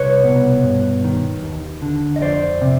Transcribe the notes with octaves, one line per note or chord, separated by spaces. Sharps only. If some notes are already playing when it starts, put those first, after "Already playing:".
Already playing: C2 B4 C#5
B2
G2
D#3
D#2
D3
D#5
F2 C5 D5
C3